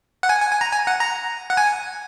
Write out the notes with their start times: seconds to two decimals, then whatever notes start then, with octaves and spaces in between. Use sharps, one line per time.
0.23 F#5
0.29 G#5
0.41 G#5
0.51 G#5
0.61 A#5
0.72 G#5
0.87 F#5
1.00 A#5
1.50 F#5
1.57 G#5